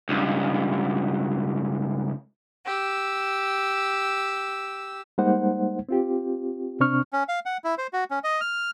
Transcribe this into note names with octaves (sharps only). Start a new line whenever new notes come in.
C#2 G2
G4 E6
G3 G#3 A#3 D#4 C5 F#5
C4 F4 G4
C3 C4 D4 C#6 F6
C#4
F5
F#5
E4
C5
F#4
C#4
D#5
F6